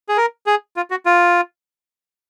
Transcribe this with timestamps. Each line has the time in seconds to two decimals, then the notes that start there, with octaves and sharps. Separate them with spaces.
0.09 G#4
0.17 A#4
0.46 G#4
0.77 F4
0.91 F#4
1.06 F4